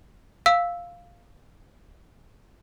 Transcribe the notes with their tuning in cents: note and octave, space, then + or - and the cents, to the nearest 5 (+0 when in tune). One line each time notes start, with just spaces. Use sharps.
F5 +0 E6 -5